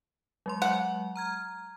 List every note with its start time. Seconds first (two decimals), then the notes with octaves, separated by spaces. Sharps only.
0.46 F#3 G#3 C6
0.62 F#5
1.16 A#5 F6 G#6